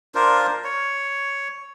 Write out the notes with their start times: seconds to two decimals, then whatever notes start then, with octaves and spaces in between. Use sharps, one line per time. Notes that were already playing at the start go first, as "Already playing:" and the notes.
0.15 D4 F4 A#4 C5
0.64 C#5